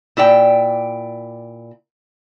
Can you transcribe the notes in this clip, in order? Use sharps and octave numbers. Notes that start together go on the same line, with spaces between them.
A#2 E4 D5 G5